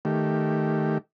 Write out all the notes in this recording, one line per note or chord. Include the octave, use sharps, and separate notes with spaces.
D#3 A3 G4